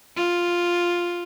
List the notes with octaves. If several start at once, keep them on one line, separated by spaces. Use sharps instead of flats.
F4